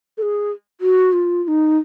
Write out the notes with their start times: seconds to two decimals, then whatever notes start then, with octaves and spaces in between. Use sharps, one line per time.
0.18 A4
0.22 G#4
0.81 F#4
1.13 F4
1.44 F4
1.48 D#4